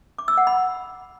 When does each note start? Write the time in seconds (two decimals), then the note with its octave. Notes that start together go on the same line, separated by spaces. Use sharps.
0.18 D6
0.28 E6
0.37 F#5
0.47 B5